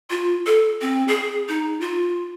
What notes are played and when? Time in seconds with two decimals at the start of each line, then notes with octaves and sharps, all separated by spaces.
0.10 F4
0.47 A4
0.81 C4
1.08 G#4
1.49 D#4
1.81 F4